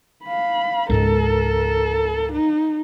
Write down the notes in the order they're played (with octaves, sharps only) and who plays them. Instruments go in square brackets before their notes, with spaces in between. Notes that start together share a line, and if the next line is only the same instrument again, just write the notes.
[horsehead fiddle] F5 B5
[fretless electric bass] C#2 G#2 G#3 [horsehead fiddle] A4 A#4
[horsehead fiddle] D#4